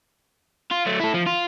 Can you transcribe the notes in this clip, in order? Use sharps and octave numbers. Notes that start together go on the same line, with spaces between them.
F4
F#3 A3
E4 A4
F3
F4